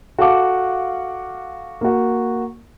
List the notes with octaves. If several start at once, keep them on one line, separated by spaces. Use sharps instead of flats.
F#4 A4 F5 F#5 D6
A#3 F#4